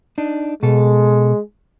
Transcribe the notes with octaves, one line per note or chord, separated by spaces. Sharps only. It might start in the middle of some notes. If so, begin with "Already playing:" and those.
D4 D#4
B2 G#3 A4